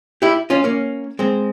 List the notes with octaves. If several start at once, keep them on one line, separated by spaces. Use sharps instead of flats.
E4 G4
C#4 F4
A#3 C#4
G#3 C4